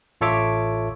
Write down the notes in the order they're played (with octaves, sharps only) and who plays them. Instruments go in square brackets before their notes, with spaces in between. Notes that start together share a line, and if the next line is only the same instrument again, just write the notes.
[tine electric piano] A1 F4 A4 C#5 E5 D6